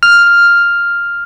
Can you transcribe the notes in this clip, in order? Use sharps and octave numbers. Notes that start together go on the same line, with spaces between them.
F6